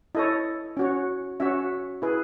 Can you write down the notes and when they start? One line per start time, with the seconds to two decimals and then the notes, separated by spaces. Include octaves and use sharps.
0.15 E4 A4 C#5 D#5
0.77 C#4 F#4 C#5
1.40 C#4 F#4 C#5 E5
2.02 E4 G#4 B4